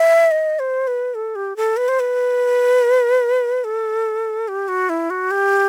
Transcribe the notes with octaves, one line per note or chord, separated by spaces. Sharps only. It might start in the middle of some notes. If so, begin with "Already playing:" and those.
Already playing: E5
D#5
C5
B4
A4
G4
A4
B4
C5
B4
A4
G4
F#4
E4
F#4
G4